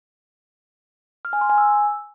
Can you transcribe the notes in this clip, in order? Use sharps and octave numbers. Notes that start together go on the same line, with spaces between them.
F6
G#5
C6
G#5
E6